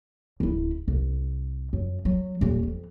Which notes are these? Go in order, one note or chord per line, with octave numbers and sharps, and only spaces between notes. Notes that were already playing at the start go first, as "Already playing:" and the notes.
D1 E4
C2
F#2
F#3
D#1 A#2
F2